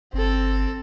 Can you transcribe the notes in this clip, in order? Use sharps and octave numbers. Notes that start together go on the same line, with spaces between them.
G1 C4 A4